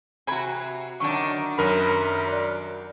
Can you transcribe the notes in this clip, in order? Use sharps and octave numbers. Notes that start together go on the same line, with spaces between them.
C3 C4 F#4 G#5 B5
F#2 D3 D#3 D4 C#6
F#2 A2 D#3 F#3 A#4 C#5 F#5 B5
G3 D5